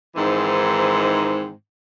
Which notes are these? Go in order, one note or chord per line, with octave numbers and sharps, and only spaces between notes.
G#2 D#3 E3 C4